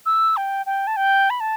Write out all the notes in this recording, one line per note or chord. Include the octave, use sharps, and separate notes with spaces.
E6
G5
G5
A5
G5
B5
A5